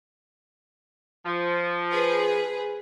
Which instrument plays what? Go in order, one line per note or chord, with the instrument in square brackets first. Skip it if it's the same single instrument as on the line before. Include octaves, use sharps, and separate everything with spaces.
[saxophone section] F3
[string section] G#4 B4